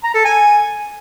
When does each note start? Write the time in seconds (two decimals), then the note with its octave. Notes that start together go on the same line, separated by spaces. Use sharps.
0.04 A#5
0.14 A4
0.25 G#5